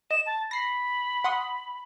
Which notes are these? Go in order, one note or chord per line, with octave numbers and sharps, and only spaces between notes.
D#5 E7
A5
B5 A#6 C7
F#5 C6 D#6